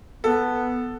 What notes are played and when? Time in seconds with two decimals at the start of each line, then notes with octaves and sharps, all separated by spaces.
0.24 B3 A4